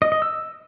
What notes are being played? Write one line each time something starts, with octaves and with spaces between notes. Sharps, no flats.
D#5
D#5
E6